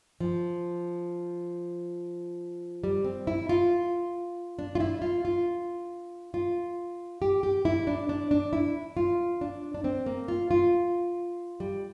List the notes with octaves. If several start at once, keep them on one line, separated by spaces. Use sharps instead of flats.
F3
G3
C4
E4
F4
D4
F4
E4
F4
F4
F4
G4
G4
E4
D4
D4
D4
E4
F4
D4
D4
C4
A#3
F4
F4
G3